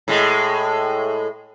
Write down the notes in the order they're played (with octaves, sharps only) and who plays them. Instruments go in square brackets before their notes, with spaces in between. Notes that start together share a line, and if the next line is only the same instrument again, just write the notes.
[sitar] A2 G#3